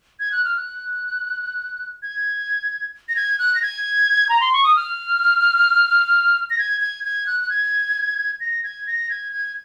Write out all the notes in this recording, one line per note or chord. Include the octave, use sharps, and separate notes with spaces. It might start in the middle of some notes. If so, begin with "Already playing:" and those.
G#6
F#6
F6
F#6
G#6
A#6
G#6
F#6
A#6
G#6
A#5
C6
C#6
D#6
F6
A#6
G#6
G#6
G#6
F#6
F#6
G#6
A#6
G#6
A#6
G#6
G#6